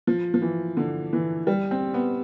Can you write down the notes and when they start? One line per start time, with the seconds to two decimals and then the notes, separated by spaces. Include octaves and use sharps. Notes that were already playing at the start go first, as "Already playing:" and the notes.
0.07 F3
0.34 F3
0.42 E3
0.77 D3
1.13 E3
1.47 G3
1.71 C4
1.94 B3